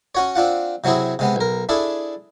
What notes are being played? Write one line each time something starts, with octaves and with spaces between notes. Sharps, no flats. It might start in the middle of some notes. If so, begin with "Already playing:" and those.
C#4 F#4 C#5
C4 D4 F4 F#5
C3 F#3 C4 E4 G#4
C3 G#3 B3
B1 A#4
D4 E4 G#4 A4